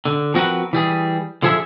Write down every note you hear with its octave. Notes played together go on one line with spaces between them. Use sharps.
D3
F3 C4 F#4 A#4 B4
E3 G3 G#4
D3 F3 G#4 A4 E5